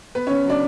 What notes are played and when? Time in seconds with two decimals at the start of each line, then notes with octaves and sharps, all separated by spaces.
0.15 B3 B4
0.27 C#3 C#4 C#5
0.46 F#3 D4 D5